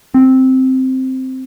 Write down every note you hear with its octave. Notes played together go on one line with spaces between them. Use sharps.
C4